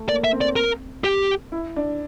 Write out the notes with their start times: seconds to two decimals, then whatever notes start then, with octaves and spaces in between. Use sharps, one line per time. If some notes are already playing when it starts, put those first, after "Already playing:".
Already playing: A3
0.08 A#3 D5
0.24 E5
0.33 C4
0.41 D5
0.56 A#4
1.04 G4
1.52 E4
1.76 D4